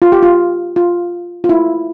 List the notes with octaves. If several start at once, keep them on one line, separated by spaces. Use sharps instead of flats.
F4
G4
F4
F4
F4
E4